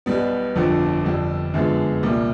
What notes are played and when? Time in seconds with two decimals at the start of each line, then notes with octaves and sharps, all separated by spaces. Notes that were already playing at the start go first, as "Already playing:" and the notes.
0.06 B1 B2 G3 B3
0.56 G1 F2 D3 F3
1.05 F2 D3 G3
1.54 F#2 D3 F3 G#3 B3
2.03 C2 A#2 G3 A#3